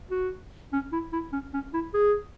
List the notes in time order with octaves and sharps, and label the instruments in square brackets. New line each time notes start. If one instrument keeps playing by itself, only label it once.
[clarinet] F#4
C#4
E4
E4
C#4
C#4
E4
G#4